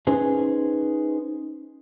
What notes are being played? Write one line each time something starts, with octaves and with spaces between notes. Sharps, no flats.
C#4 D#4 G#4 B4 C5